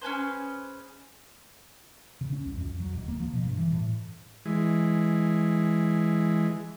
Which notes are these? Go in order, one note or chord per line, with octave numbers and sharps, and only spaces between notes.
C#4 G#4 B4 C5
C#3
C#4
C2
F2
F#3
D1
A#3
F3
B2
G2
E3
A2
E3 G#3